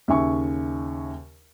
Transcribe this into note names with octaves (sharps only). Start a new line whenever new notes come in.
D#2 C#3 E5 G#5 C#6